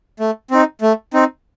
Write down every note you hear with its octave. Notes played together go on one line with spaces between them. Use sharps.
A3
C4 D#4
A3
C4 D#4